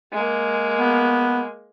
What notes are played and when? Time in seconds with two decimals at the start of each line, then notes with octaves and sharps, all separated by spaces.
0.12 G#3 A#3
0.79 B3